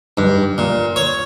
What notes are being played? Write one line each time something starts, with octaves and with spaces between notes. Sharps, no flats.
G2
A#2
C#5